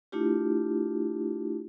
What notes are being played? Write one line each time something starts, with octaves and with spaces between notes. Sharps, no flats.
A3 D4 E4 F4 G4